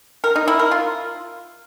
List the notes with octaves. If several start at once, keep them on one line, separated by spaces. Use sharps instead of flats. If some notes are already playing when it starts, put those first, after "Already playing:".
A#4
D#4
E4
A#4
F4